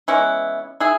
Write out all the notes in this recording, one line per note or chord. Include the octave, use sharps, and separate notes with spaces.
E3 G#3 B3 C#4 E4
E4 G#4